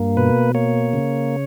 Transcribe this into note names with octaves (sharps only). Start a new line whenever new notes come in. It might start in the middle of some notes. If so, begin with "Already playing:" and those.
Already playing: G2 A#3
B2 B4
A#3 C#5
C#3